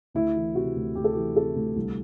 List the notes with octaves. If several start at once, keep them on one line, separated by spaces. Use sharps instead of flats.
D2 E4
E3
C3 F#4
D2
D2 G4
A4
E3 G4
C3 A4
D2
C2